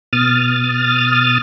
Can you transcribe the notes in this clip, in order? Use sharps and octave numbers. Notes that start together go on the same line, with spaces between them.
B2 D#6 F6 A6